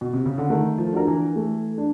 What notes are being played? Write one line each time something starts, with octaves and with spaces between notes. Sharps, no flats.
B2
C3
C#3
D3
D#3 A3
F3
D4 F#4 A#4
E3
A3
D4